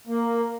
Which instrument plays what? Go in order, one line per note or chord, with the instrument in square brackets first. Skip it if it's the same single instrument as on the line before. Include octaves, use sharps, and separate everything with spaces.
[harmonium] A#3